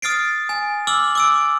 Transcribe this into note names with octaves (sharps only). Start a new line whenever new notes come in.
D#6 F6 A6 C7 D7
G#5
D6 E6 F6 F#7
D6 E6 D7